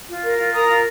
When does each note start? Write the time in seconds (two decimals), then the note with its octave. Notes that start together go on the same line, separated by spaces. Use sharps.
0.09 F4
0.24 A#4
0.39 F4
0.53 A#4 A#5 D#6
0.69 F4